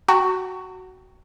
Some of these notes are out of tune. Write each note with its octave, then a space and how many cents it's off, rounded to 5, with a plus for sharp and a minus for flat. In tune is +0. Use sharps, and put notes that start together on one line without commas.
F#4 +10 G5 +0 A#5 -45